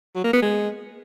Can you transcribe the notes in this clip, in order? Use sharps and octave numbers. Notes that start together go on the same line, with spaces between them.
F#3
A#3
B3
G#3